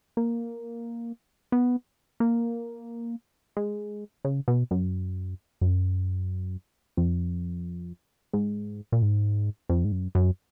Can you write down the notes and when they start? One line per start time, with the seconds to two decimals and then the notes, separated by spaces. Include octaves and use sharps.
0.17 A#3
1.52 B3
2.20 A#3
3.57 G#3
4.25 C#3
4.48 B2
4.71 F#2
5.61 F#2
6.97 F2
8.33 G#2
8.92 A#2
9.02 G#2
9.69 F2
9.85 G#2
9.92 F#2
10.15 F#2